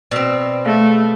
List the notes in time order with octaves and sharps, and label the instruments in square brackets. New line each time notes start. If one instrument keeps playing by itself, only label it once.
[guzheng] B2 C4 [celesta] D5 E6 F7
[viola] A3 [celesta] G#4 F5 A#6